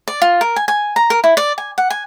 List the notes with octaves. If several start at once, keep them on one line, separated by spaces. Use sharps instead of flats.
D5
F4
A#4
G#5
G#5
A#5
A#4
E4
D5
G#5
F#5
G#5